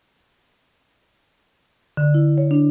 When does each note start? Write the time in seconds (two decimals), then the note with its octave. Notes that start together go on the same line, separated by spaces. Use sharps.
1.97 D3
2.14 E4
2.38 C#5
2.51 D4